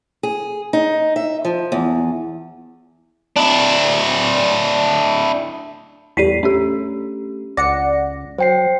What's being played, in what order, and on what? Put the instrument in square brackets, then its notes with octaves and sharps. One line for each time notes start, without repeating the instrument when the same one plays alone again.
[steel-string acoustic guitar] G#4
D#4
E5
F3
E2
[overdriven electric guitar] D4 E4
[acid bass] E2 [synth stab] A2 G3 [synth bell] B6 C7 D#7
[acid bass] A3 [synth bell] C#4 D4 G4
[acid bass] C#2 [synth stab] D5 F#5 C#7 [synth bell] A#6
[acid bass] F#3 [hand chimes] C5 G5 C7